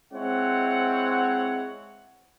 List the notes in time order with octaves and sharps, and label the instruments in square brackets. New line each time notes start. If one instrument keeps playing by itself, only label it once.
[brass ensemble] G#3 C4 E4 C#5 F#5